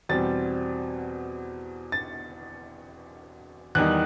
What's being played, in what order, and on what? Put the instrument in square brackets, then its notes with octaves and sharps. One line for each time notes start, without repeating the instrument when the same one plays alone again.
[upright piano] E2 B2 G3 C4 A6
A6
E2 D#3 G3 D#4 F#6